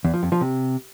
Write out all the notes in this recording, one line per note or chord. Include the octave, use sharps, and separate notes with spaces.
E2
F3
F2
F3
C3